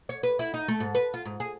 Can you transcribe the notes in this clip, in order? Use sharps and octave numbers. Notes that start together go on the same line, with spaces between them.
C#5
B4
E4
D#4
A3
G#2
B4
F4
G#2
G#4